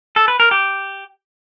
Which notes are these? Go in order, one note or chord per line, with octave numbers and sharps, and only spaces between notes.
A4
B4
A#4
G4